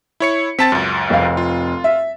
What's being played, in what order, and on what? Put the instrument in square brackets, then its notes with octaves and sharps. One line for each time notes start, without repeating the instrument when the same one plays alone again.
[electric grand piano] E4 C#5 C#7
[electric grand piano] C4 A5 A6 [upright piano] B6
[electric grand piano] C#2 F#2
[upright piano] F1 C4 F5
[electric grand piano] F4
[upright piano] E5